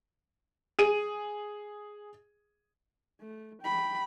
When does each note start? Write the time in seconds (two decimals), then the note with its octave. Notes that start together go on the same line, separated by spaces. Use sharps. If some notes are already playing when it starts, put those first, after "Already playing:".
0.79 G#4 D#7
3.20 A3
3.62 G5 B5